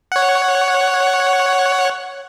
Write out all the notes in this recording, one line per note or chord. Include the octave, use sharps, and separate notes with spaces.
C#5 F#5